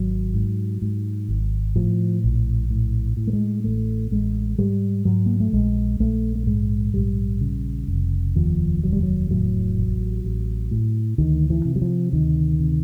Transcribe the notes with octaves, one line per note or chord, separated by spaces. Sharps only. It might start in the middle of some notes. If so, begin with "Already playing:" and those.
Already playing: G#1 F#3
G#2
G#2
G#1
A2 F3
A#1
A2
A2
A3
G#3
A1 A3
A1 G#3
G#2 G3
G#2 F#3
A#3
A3
A#1 G#3
A#1 A3
A3
G#2 G#3
A#1 G3
C#3
F1
D#2 F3
F1 F#3
G3
F#3
A2 F#3
A1
A1
A2
D2 D#3
E3
C3
F#3
F3
D2 D#3
C3